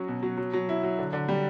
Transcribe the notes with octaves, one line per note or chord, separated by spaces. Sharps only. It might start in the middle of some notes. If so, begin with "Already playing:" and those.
Already playing: F#3 C#4 F#4
B2
F#3
F#3
F#3
E4
F#3
D3
D3
G3